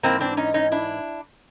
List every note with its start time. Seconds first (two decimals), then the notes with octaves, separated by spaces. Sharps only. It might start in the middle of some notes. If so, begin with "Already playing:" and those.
0.03 G#2 E3 A#3 C4
0.21 C4 D4
0.37 C#4 D#4
0.54 C#4 D#4
0.72 D4 E4